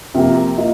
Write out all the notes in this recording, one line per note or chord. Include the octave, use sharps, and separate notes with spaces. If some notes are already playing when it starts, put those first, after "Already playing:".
C3 F3 A#3 G4 A#4
A#3 F4 D#5